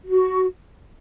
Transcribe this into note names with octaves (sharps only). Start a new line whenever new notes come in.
F#4